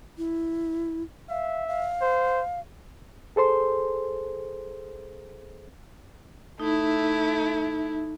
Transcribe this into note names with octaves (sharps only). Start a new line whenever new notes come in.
E4
E5 F5
F5
C5
G#4 A4 C5 C6
A3 D#4 E4